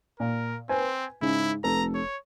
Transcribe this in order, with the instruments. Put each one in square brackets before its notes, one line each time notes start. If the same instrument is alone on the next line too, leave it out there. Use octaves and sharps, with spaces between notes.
[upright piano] A#2 [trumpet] A#4
[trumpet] C4 [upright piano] B4 C5 G#5
[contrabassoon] G#2 [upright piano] C#3 [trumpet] E4
[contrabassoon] F1 [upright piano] A4 B4 [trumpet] A#5
[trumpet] C#5